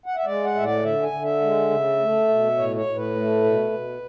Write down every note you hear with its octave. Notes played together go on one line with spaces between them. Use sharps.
F#5
E5
G#3 D5
F#5
A2 E5
D5
D3 E5
G#5
D3
E5
G#3
C#3
A3
B2
A2 C#5
C#5
A2
B4
A3
B2
B2